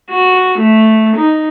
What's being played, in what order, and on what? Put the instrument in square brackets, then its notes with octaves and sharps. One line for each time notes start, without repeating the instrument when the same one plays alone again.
[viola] F#4
A3
D#4